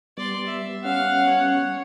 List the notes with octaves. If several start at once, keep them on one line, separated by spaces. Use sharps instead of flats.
G3 B3 D5 C6
E5
C#4 F5 F#5
C#5